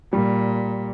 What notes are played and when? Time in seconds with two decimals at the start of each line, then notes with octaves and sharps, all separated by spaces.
0.13 A#2 G3